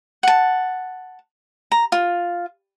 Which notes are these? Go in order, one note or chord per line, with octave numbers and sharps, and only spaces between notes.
F#5 A5
A#5
F4